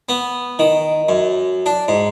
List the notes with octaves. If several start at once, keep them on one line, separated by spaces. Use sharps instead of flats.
B3
D#3
F#2
D4
G#2